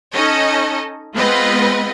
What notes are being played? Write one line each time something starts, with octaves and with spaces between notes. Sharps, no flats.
C#4 D#4 A4 D#5
G#3 B3 C4 F4 B4 D#5